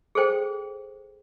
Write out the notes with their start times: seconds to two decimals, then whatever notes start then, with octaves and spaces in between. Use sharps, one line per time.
0.15 G#4 A4 C5 G5